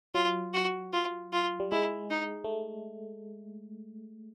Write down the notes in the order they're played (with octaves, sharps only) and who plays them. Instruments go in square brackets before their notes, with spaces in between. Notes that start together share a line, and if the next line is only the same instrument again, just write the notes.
[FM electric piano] F#3 [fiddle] F4
[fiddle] F#4
F4
F4
[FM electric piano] G3
[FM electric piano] G#3 [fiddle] E4
[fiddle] D#4
[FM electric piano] A3